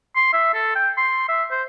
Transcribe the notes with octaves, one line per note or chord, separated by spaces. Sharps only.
C6
E5
A4
G5
C6
E5
C5